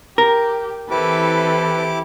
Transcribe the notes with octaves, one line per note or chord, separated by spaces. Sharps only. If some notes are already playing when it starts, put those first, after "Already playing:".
G4 A#4
E3 C4 E4 G4 A4 B4 D6